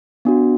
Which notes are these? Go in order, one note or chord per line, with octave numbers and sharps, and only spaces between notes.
B3 D4 F#4